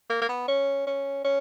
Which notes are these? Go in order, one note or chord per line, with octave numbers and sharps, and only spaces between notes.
A#3
A#3
B3
C#4
C#4
C#4